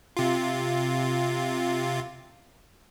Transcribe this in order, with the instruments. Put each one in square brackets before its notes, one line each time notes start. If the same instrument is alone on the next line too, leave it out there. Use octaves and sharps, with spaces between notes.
[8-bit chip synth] C3 F4